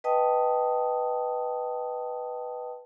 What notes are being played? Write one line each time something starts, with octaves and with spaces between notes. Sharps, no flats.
B4 D#5 G5 A5 D#6